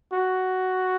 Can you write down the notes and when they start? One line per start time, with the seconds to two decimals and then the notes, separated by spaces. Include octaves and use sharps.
0.12 F#4